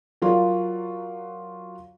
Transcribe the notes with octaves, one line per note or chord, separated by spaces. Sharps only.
F#3 F4 A#4 D5